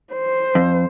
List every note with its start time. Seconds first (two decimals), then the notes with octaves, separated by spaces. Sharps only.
0.13 C5
0.55 F2